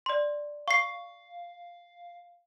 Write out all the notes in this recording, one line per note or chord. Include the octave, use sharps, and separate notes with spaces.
D5 C6
F5 C#6 C7